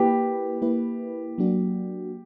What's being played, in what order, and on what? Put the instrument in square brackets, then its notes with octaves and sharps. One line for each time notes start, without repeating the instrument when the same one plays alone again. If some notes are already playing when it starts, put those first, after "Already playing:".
Already playing: [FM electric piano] A#3 E4 B4 [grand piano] G4
[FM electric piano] A#3 E4 B4
F#3 A#3 D4 F#4